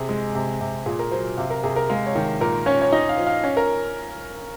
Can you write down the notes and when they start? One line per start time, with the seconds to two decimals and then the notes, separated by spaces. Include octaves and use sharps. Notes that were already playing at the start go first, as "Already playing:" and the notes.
Already playing: C3 G#4
0.09 G#3
0.35 C3
0.61 C3
0.86 A#2 G#4
0.99 A#4
1.11 F#3 C5
1.37 C3 F5
1.50 A#4
1.63 C3 G#4
1.76 A#4
1.89 G#3 F5
2.06 C#5
2.15 D#3
2.41 A#2 A#4
2.66 C#4 C#5
2.81 C#5
2.92 D#4 D#5
3.09 F5
3.17 F3
3.27 F5
3.44 C#4
3.57 A#4